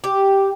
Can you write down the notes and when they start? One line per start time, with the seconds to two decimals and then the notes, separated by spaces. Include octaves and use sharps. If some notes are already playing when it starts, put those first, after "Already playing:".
0.04 G4